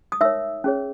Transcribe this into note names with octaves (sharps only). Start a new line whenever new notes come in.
D#6
D#4 A#4 C#5 E5 E6
C#4 G#4 C#5